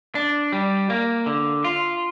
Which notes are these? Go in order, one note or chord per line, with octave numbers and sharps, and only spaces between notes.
D4
G3
A#3
D3
F4